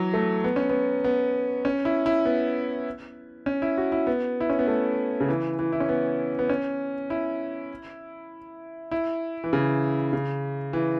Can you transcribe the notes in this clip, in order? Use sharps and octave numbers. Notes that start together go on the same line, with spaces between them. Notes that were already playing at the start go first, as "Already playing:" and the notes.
Already playing: E3 F#3
A3
B3
C#4
B3
B3
C#4
E4
E4
B3
C#4
E4
F#4
E4
B3
E4
C#4
B3
A3
C#3
E3
E3
E4
C#4
B3
B3
C#4
E4
E4
E3
C#3
C#3
E3